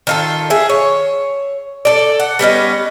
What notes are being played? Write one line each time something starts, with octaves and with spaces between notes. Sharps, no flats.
D#3 F4 A4
G#4 E5
C#5
A4 D5
F#5
G3 B3 C#4 D#4